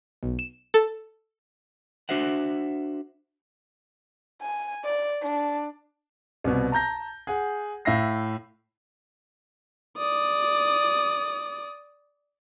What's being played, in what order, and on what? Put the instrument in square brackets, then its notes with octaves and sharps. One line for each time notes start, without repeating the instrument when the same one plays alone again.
[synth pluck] B1
E7
A4
[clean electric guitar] D4 F#4 C5 E5 F#5
[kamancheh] G#5
D5
D4
[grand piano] C2 B2
A5 A#5 G6 A#6
G#4 F#5
A2 E5 F5 A#6 C7
[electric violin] D5 D#6